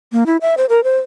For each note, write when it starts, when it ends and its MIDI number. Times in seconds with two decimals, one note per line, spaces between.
0.12 0.24 58
0.26 0.37 64
0.41 0.55 76
0.57 0.66 72
0.69 0.84 70
0.84 0.97 72